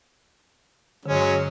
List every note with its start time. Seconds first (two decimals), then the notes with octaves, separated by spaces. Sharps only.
1.06 G2 D3 F#3 G#3 C#4